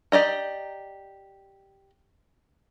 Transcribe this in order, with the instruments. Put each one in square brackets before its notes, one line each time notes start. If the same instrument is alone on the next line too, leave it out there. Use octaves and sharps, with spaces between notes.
[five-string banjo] G4 D5 D#5 A#5